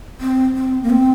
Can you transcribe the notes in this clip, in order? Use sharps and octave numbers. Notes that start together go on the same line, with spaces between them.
C4
C4
A#3
C4